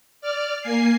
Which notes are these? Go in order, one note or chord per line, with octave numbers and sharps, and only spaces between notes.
D5 F6
A#3 G#5 C7